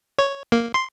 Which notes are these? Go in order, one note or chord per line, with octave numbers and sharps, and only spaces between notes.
C#5
A#3
C6